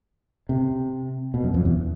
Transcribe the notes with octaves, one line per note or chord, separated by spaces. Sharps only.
C3
B2
F#2
F2
E2